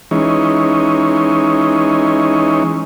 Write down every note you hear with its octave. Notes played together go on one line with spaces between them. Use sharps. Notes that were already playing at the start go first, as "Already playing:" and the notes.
E3 G#3 C#4 D#4